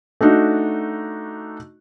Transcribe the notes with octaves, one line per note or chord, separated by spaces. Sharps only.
A3 D4 D#4 F#4